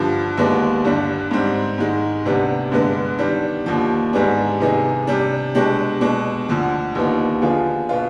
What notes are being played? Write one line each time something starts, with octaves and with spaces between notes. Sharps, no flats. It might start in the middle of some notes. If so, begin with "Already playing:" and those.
Already playing: G2 D3 F3
D#2 D3 G#3 B3 D4
G2 D3 G3 D4
G#2 G3 C4
G#2 D#3 G#3
D2 C3 G3 B3 D4
G2 D3 G#3 B3
D#3 G3 B3 D4
D#2 D3 F3
G#2 G3 B3 D4 G#4
C3 D#3 B3 D#4 G#4
C3 G3 D4
B2 G#3 D4 G4
B2 G#3 D4
D2 D3 F3
D#2 D3 F3 B3 D#4
D3 F3 B3 F4 G#4
B2 B3 F4